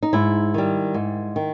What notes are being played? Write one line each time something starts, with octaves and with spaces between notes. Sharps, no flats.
D#4
G#2 E4
D#3 G3
G#2
D#3